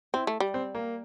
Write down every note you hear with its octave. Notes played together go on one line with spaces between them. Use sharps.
C4 E4
A3
G3
C4
A#3